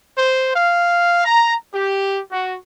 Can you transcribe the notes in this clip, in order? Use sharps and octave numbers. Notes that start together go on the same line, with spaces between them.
C5
F5
A#5
G4
F#4